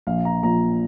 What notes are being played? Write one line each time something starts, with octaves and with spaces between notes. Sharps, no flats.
A#1 F5
A#5
A#2 F3 A#5